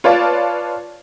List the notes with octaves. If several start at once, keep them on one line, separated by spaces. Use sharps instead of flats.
F4 B4 C#5 D5 F5 A5